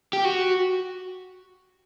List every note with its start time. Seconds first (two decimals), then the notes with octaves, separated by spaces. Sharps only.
0.13 G4
0.25 F#4